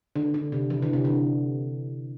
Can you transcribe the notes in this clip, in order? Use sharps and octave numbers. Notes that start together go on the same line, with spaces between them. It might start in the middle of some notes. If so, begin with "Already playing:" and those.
D3
D3
C3
E3
D3
C3
D3